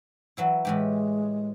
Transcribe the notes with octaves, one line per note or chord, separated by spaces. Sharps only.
E3 F#3 E4
A2 E3 G#3 G4